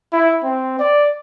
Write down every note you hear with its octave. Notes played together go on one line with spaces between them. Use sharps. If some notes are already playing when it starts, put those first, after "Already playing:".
E4
C4
D5